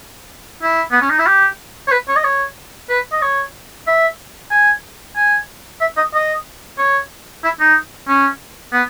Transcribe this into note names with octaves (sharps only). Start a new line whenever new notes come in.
E4
B3
C#4
D#4
E4
G4
C#5
B4
C#5
D#5
C#5
B4
D#5
C#5
E5
G#5
G#5
E5
D#5
D#5
C#5
E4
D#4
C#4
B3